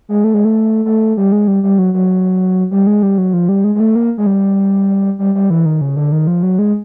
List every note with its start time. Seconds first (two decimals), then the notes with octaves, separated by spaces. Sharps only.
0.09 G#3
0.24 A3
0.34 G#3
0.45 A3
0.85 A3
1.17 G3
1.32 G#3
1.48 G3
1.63 G3
1.79 F#3
1.94 F#3
2.71 G3
2.87 G#3
3.03 G3
3.18 F#3
3.33 F3
3.49 G3
3.64 G#3
3.75 G#3
3.80 A3
3.96 A#3
4.18 G#3
4.26 G3
5.19 G3
5.35 G3
5.50 E3
5.66 D#3
5.81 C#3
5.96 D3
6.12 D#3
6.27 F3
6.43 F#3
6.59 G#3